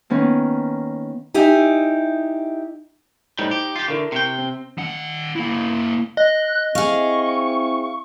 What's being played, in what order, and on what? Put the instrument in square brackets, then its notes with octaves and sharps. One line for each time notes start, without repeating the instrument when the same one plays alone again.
[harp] D#3 A#3 B3 C#4
[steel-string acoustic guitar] D#4 E4 G4 G#5
[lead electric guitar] A2 G3 [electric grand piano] D#4 C5 A#5
[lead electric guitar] G4
F4 G4
[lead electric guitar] D3 [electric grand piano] E4 A#4 C#6
[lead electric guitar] C3 G5
[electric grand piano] C4
[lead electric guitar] D#3 F#5
A#3 E4
[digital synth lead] D#5 [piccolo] F#6
[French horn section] C4 E4 [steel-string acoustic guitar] G#4 F5 [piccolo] C#6